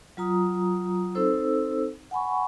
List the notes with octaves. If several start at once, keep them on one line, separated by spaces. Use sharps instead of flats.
F#3 F4 A#5 D#6
C4 D#4 A4 C5 E6
F#5 G#5 B5 C#6